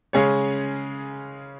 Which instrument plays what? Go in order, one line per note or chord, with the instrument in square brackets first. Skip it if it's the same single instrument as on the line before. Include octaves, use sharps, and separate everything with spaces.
[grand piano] C#3 G#3 C#4 G#4 C#5